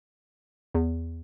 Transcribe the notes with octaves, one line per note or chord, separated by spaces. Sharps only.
E2